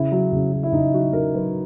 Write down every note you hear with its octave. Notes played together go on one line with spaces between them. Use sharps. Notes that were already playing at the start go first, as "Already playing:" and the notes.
Already playing: C#3 E4
F#3
C#3
F#3
E4
C#3 D#4
F#3 F#4
C#3 A#4
F#3 B4